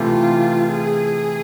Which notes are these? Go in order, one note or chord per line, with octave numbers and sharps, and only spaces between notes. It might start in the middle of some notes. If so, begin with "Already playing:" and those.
Already playing: C3 E3 A3 F4
G#4